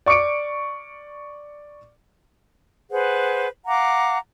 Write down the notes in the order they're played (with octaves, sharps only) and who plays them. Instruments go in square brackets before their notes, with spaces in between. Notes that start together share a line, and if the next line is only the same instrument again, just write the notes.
[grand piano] D5 C#6 D6 C#7 D7
[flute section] G#4 B4 C5 F#5
F5 F#5 A#5 D6